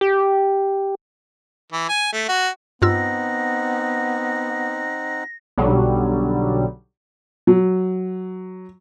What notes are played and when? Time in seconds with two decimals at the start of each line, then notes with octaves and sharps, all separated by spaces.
0.01 G4
1.72 E3
1.89 G#5
2.13 A3
2.28 F#4
2.82 G2 B3 C4 D#4 F4 F#5 E6 A#6
5.58 B1 D3 F#3 G3
7.47 F#3